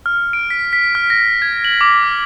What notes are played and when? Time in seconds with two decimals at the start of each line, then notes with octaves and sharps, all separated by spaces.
0.06 F6
0.33 D7
0.50 B6
0.73 B6
0.95 F6
1.10 A#6
1.42 G#6
1.64 F#7
1.81 D6
2.03 F6